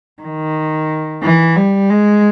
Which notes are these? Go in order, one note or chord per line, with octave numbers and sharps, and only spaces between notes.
D#3
E3
G3
G#3